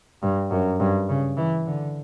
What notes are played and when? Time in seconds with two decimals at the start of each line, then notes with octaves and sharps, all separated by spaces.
0.22 G2
0.50 F#2
0.80 G2
1.09 C#3
1.37 E3
1.67 D3